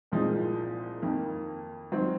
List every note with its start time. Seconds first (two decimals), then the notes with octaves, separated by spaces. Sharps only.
0.12 C2 A#2 F3 G#3 D#4
1.02 F2 D#3 A#3
1.92 D#3 F#3 C4